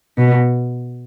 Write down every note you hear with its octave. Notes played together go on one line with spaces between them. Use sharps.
B2